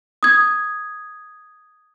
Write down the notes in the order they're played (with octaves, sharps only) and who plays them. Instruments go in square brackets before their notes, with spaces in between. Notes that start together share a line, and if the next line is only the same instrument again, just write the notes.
[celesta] D#6 G#6